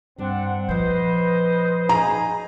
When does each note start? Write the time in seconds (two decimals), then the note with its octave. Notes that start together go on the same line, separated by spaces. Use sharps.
0.18 G2 G3 C4 D4 F#5
0.69 A#2 F3 B4 C5 D#5
1.89 D#4 G#4 G#5 A#5